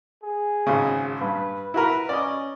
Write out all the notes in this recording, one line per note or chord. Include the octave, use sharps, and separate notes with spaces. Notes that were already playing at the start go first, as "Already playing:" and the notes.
G#4
G#1 C#3
G2 B4
E4 F#4 A#4 B4
C#4 D5 D#5